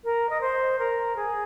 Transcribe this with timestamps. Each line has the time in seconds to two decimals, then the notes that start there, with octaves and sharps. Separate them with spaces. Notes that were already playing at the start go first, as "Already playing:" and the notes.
0.04 A#4
0.30 D#5
0.41 C5
0.79 A#4
1.16 G#4